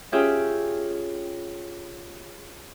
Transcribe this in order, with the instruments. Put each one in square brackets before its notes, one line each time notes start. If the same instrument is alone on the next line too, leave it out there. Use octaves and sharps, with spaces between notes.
[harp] C#4 F4 G4 G#4 E5 G5